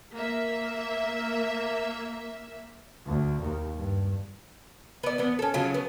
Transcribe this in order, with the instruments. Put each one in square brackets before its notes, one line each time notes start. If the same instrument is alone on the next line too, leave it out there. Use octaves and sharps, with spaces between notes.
[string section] A#3 E5
[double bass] D2
D#2
G2
[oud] B3 D5
E2 B3
C#4 A4
C#3 F#3 F4
B3